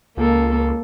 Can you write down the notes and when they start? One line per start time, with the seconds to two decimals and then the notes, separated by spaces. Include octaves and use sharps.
0.17 C#2 A#3 A4